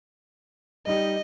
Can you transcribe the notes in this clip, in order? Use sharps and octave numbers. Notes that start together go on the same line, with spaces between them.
G3 D#4 G4 D#5